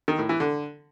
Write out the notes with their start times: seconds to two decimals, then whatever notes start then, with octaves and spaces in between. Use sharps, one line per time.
0.08 D#3
0.19 A2
0.29 E3
0.40 D3